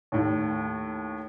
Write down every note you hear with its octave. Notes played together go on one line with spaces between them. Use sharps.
D#2 A2